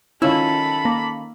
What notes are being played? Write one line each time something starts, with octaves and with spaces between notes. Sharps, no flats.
D#3 C#4 E4 F4 A4 B5 E6
A#3